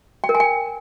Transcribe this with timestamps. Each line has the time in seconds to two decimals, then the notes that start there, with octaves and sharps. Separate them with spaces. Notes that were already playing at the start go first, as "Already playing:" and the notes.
0.24 G5
0.29 A#4
0.35 G#5
0.40 G5